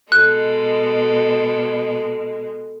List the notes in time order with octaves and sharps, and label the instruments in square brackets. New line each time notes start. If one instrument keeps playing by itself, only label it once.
[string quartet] B2 G#3 [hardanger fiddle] A4 [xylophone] F#6